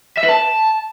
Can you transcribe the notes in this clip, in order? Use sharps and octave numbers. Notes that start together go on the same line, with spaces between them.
E5
B4
A5